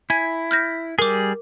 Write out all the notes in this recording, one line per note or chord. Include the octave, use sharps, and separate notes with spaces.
E4 G#5 G#6
F6 G6 A#6
G3 G#4 A#4 D6